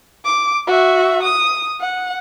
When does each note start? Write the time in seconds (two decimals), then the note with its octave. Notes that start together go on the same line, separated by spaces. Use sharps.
0.25 D6
0.67 F#4 E5
1.22 D#6
1.80 F#5